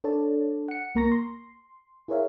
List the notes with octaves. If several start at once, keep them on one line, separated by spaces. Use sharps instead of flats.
D4 A4 C#5 D5 A5
F#5 C#7
C2 A#3 A#4 A#5 C#6 A#6
C6
E4 G#4 A#4 C#5 E5 F5